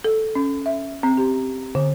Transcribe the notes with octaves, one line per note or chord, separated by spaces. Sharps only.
A4
C#4
E5
C4
G4
D3